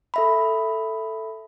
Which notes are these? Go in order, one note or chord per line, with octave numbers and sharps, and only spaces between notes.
A4 E5 B5